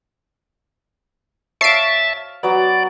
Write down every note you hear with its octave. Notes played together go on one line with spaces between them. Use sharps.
C#5 E5 F5 A5 C7 D7
F#3 B3 D5